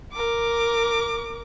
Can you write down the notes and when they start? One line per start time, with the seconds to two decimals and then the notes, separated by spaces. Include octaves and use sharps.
0.13 A#4 D6